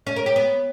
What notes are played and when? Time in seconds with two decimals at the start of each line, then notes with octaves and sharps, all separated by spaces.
0.07 C#4
0.16 A#4
0.26 G4
0.36 B3